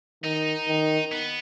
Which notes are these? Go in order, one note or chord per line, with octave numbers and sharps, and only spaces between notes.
D#3 D#4
D#3
B3